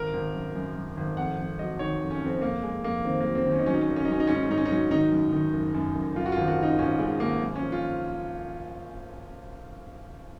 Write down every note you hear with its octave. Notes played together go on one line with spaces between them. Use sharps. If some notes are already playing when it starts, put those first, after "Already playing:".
Already playing: G#1 A#4
G#1
F#2
F#2
F#2
G#1
F2 F#5
F2
F#3 D#5
D#3 C#5
F2
C#4
F2 C4
F2 A#3
F2 G#3
F2 A#3
D#3 C4
F#3 A#3
C4
D#3
C#4
D#4
F#3 C#4
D#4
C#4
G#1 D#4
C#4
D#4
F#3 C#4
D#4
G#2 C#4
D#4
C#4
G#2 D#4
C#4
D#4
F#3 C#4
D#3 D#4
F#2
D#3
F#1
F#2
F#1
F#2 F4
F#4
F4
G#1
F#4
C#3 D#4
G#1 C#4
C#3 G#3
G#1 A#3
F#2
C#4
F3
F4